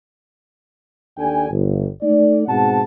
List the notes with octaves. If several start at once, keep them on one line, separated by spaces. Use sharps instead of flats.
D#2 D4 A4 D5 G5 G#5
G1
A3 D#4 A4 D5
G#2 B2 C4 G#4 F#5 A5